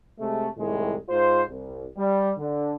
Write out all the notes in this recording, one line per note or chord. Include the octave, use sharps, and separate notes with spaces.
C3 G#3 A3
C2 A2 D#3 G#3
G#2 F4 C5
C2
G3
D3